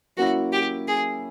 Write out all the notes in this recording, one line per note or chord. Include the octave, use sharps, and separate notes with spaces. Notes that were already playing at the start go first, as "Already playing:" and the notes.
F#3 A#3 C#4 E4 F#4
G4
G#4